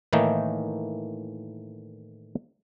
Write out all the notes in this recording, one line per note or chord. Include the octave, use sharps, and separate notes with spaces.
A2 D#3 E3 A3 A#3 D#4